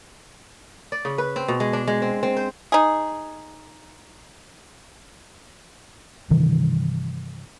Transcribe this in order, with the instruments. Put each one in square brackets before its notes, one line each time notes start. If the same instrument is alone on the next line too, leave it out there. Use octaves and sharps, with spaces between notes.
[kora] D5
C#3
B4
C4
B2
G#3
D4
G#3
C4
C4
C5
[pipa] D#4 G#4
[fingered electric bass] G2 C3 D#3 E3